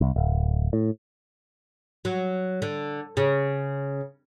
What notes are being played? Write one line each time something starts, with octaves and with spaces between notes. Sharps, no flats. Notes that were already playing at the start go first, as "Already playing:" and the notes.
C2
D1
A2
F#3
D3
C#3